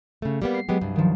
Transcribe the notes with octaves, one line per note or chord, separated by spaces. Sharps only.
C#3 A3
G3 A#3 B3
C7
F#3 G#3 B3 G4
C2 G2
D#3 F3